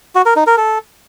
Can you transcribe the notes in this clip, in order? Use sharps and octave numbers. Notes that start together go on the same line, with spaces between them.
F#4
A#4
D#4
A#4
A4